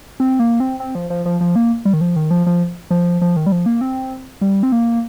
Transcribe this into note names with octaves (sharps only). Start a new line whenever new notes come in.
C4
A#3
C4
C4
F3
F3
F3
F3
A#3
G3
D#3
F3
D#3
F3
F3
F3
F3
D#3
G3
F3
A#3
C4
G3
C4
A#3